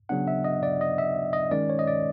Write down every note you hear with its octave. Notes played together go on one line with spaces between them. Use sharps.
C#3 F#3 B3 D4 F#5
E5
D#5
D5
D#5
E5
D#5
D#3 G#3 C#4 D5
C#5
D#5
D5